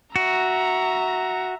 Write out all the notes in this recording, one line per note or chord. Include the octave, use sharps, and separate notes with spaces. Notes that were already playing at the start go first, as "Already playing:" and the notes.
F#4 E5 A#5